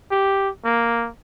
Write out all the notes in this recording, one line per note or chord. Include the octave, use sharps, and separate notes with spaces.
G4
A#3